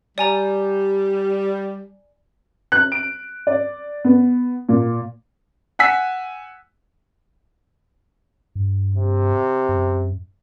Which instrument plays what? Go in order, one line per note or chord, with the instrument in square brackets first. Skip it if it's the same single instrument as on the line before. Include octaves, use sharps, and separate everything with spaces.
[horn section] G3 [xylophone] D5 G#5 A#5
[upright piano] F#6
D7
D5
B3
A#2
F#5 G#5 E6 B6
[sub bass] G2
[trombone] C3
[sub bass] F#2